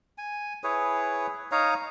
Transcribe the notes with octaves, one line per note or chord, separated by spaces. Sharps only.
G#5
E4 G#4 B4 C#5
D#4 C#5 F5 A#5